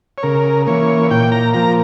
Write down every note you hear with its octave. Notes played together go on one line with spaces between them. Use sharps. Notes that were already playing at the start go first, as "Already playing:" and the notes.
C#5
C#3 A#4
E3 A#3 C#5
A#2 G5
A#5
F3 A#3 A#5